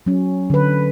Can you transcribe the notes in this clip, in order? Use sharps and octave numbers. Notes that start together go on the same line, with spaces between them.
F#3 C#4
D3 B4